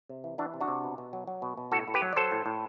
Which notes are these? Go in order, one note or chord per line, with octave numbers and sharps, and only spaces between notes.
C3
E3
E3 D4 F#4
C3
D4 F#4
C3
B2
B2
F#3
F#3
B2
B2
A2 F#4 A4
A2
G4 B4
F#3
D5
F#3 A4 C5
A2
A2